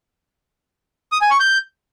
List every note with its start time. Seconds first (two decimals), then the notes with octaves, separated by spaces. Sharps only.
1.12 D#6
1.21 G#5
1.31 C#6
1.40 G6